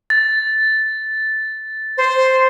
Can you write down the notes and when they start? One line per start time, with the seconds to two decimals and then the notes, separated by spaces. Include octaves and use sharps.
0.10 A6
1.98 C5